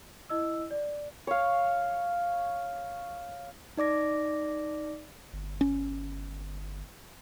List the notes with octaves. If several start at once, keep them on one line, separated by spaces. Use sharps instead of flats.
E4 D#5 E6
D5
C#5 F5
D#4 D5 D6 A#6
G1
C#4